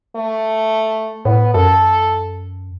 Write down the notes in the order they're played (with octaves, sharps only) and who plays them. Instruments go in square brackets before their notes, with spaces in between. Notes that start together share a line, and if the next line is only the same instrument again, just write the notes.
[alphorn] A3
[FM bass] A2 [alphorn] B3
[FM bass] F#2 [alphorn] A4